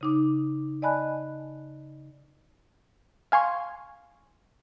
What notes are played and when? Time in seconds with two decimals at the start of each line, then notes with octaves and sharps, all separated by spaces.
0.01 C#3 D#4 D6
0.82 D5 D#5 G#5 A5 B5 F#6
3.32 F5 G#5 C6 C#6